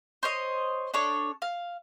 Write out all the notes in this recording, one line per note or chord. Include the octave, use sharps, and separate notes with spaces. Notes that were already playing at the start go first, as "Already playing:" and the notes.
C5 C#5 D#5
D4 A4 C#5
F5